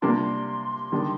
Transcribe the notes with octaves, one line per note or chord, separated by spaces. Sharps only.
C3 G3 A#3 D4 F4 C6
D#3 G3 D4